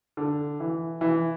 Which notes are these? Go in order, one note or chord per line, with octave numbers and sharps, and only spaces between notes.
D3
E3
E3